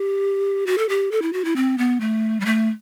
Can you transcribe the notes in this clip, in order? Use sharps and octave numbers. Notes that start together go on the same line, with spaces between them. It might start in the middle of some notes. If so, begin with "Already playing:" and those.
Already playing: G4
F#4
A4
G4
A4
E4
F#4
E4
C4
B3
A3
G3
A3